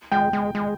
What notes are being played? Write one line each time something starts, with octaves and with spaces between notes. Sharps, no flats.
G#3 G5
G#3
G#3